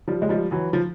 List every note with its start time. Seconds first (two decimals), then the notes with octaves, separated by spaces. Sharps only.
0.08 F3 G3
0.22 G#3
0.29 F3 G3
0.51 E3 F#3
0.73 F3